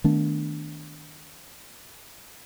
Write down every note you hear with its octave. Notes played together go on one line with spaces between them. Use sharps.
D#3 A3 B3 D4